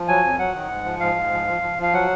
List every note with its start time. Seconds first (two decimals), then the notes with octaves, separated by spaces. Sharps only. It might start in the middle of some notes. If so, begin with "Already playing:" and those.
Already playing: F3
0.08 F#3 G#5
0.23 F2
0.39 F#3 F#5
0.54 D#3
0.69 G#2
0.85 F3
1.00 G#2 F5
1.16 G#2
1.32 F3
1.48 F3
1.62 F3
1.78 F3 F5
1.93 F#3 F#5